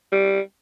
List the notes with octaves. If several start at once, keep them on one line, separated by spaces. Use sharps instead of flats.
G3